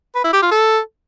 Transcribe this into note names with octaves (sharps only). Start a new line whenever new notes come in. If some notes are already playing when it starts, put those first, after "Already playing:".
B4
E4
G4
F4
A4